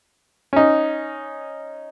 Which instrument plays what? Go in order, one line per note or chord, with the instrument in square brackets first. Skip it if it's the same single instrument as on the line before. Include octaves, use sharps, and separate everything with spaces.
[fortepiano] C#4 D#4